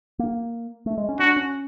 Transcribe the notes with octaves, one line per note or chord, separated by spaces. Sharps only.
A#3
A3
G#3
C#4
D4 F#4
C#4